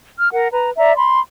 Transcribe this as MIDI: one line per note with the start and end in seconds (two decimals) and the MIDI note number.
0.18 0.32 89
0.33 0.48 70
0.33 0.48 78
0.52 0.71 71
0.52 0.71 82
0.77 0.93 74
0.77 0.93 76
0.77 0.93 82
0.96 1.20 83
0.96 1.20 84